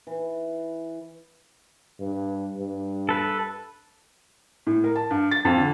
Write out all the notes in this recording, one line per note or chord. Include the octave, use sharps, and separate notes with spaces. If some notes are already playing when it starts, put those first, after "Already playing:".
E3
G2
G2
A4 B4
A2
A#4
A5
G2
A6
F2
D3